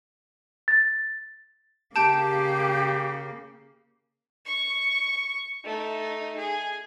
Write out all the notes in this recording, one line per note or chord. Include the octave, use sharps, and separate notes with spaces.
A6
C#3 A#3 G4 A5 G6 D7
C#6
A3 D#4
G#4